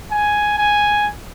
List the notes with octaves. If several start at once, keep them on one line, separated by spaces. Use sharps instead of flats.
G#5
G#5